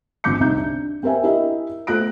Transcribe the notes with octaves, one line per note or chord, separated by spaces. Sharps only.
G#1 D3 F3 D6 G6 C#7
C2 D#4 G6
D4
C4 G4 A#4 E5 G#5
E4 G4 A#4 D#5 E5
A3 F4 F#6 A#6 D7